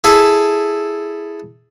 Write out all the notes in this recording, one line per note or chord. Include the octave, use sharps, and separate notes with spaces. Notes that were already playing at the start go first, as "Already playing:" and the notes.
E4 G#4 A4 E5